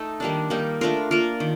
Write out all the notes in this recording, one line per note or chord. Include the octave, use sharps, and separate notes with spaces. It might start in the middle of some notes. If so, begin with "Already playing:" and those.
Already playing: A3 D#4 A4
D#3 G3 A#3 D4
G3 A#3 D#4
A3 D4 F4 A#4
A#3 F4 A#4
D#3